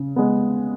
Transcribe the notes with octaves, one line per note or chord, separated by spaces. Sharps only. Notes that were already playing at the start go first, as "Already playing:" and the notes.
Already playing: C#3
G#3 B3